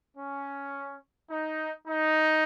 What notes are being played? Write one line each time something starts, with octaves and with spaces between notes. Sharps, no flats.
C#4
D#4
D#4